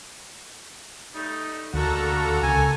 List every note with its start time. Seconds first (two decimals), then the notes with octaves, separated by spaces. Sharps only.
1.15 G3 A3 D#4
1.74 D2 G3 A#3 F#4 A4 A#5 C#6
2.43 C#2 G#5